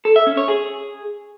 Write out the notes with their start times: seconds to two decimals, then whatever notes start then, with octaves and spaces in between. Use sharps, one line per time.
0.05 A4
0.16 E5
0.27 C#4
0.37 C#5
0.48 G#4